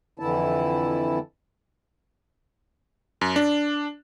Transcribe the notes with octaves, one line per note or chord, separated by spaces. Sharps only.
F2 D3 E3 E4 A5
F#2
D4